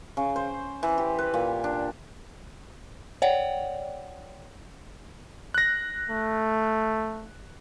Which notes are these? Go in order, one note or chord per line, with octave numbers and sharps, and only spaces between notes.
C#3
C5
E3
G4
B4
A#2
D4
C#5 D5 F#5 G5
F#6 A#6
A3